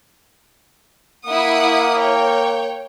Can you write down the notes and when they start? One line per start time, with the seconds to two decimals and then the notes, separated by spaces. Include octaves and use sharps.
1.27 A#3 E4 F#5 D#6
1.96 C#5 G5